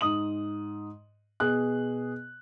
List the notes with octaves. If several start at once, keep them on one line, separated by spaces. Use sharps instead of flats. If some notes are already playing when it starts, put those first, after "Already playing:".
G#2 D#6 F#7
B2 G#4 F#6